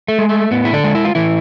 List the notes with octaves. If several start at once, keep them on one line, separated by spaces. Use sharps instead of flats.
A3
G#3
A3
A2 B3
E4
D3 D4
G#3
E4
F4
A2 E3 E4